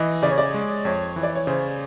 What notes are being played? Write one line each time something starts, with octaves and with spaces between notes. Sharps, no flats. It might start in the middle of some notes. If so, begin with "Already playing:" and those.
Already playing: E3 D#5
C#3 D5
C#5
D5
G#3
F2 C#5
E3
D5
C#5
C#3 C5